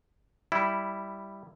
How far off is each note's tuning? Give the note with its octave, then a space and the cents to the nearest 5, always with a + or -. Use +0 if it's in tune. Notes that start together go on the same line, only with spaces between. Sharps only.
G3 +0 E4 +0